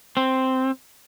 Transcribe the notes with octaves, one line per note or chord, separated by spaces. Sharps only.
C4